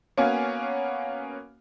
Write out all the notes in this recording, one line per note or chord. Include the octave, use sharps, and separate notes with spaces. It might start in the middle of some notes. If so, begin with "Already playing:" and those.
A#3 B3 C#4 F#4 F5 G#5